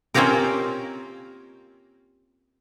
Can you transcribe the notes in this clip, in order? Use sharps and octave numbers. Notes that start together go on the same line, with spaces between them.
A#3 C4 C#4 F4 G4 A#4